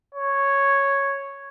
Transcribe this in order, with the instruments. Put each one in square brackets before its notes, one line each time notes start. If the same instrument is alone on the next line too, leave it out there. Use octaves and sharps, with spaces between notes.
[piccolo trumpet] C#5